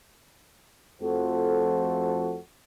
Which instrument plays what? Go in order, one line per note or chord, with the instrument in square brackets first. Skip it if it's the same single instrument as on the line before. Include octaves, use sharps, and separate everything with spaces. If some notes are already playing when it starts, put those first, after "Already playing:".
[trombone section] F2 F3 A3 F#4 A4 C5